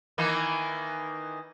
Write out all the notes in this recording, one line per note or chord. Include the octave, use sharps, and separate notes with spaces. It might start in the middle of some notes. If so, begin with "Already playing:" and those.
D#3 E3 A#3